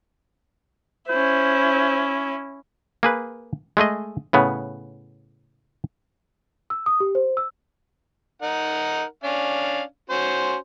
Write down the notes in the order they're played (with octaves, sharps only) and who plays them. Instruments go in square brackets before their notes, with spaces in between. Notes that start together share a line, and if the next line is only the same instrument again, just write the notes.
[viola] C#4 E4 [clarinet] C5
[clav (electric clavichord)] A#3 G#4 B4
G#3 A3 G#4 D#5
A2 C#3 B3
[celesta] E6
D#6
G4
C5
E6
[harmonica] D#4 A#4 F#5
C#4 D4 F5
C#4 F#4 C5